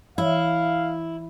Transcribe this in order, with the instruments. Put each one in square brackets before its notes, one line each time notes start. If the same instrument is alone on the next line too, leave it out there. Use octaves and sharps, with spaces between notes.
[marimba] E3 C#5 E5 [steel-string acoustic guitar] E4 [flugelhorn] F5